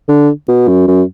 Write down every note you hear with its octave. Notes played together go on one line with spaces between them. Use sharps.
D3
B2
F#2
F#2